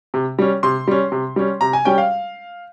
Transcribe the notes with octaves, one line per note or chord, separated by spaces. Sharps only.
C3
G3 C#4
C3 C6
G3 C#4
C3
G3 C#4
C3 A#5
G#5
G3 C#4 G5
F5